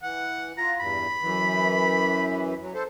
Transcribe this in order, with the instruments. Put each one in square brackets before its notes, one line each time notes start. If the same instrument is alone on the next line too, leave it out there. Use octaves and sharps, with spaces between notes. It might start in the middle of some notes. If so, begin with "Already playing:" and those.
[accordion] E3 [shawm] F#5
[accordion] F4 [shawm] A#5
[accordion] E2 G2 [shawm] B5
[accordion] F#2 E3
F#3
A4 C5